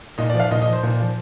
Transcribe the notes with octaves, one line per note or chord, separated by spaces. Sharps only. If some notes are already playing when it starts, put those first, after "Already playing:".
A#2 D#5
D5
F3
F5
A#2 D#5
D#5
F3
C5
A#2
F3